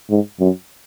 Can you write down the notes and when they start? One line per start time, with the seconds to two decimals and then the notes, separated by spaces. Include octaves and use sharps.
0.10 G#2
0.40 F#2